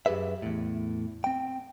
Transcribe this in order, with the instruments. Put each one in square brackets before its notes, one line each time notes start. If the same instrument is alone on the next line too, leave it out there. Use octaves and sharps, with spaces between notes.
[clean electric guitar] F#2 G4 G#4 B4 E5
E2 A2
C4 G5